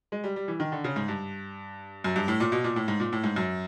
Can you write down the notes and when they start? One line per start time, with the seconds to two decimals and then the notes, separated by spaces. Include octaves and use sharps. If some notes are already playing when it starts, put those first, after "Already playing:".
0.12 G#3
0.24 G3
0.36 G3
0.48 E3
0.60 D#3
0.72 D3
0.84 C#3
0.96 G#2
1.08 G2
2.04 F#2
2.16 G2
2.28 A2
2.40 A#2
2.52 B2
2.64 A#2
2.76 A2
2.88 G#2
3.00 A#2
3.12 A2
3.24 G#2
3.36 F#2